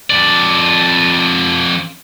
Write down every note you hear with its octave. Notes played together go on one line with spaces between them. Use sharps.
F2 D5